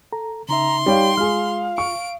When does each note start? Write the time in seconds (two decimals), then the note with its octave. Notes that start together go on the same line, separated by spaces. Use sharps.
0.13 A4 A#5
0.49 C#3 D#4 E5 A#5 C6
0.86 G3 D#4 C#5 F5 G5
1.17 G#3 F4 G#4 F5 F6
1.78 C#6 D7